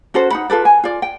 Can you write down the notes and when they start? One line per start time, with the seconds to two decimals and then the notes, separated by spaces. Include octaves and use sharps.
0.14 C#4 F#4 A4 C5
0.31 D#4 F#5 B5
0.50 F4 A4 B4 D5
0.65 G#5
0.83 F4 D5
1.02 G5